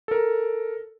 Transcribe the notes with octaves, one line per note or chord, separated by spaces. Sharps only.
A4 A#4